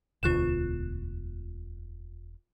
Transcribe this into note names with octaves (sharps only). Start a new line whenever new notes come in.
E1 D2 B2 F4 F#6 E7